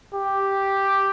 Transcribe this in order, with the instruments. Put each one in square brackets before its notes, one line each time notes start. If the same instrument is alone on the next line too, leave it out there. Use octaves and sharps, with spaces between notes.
[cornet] G4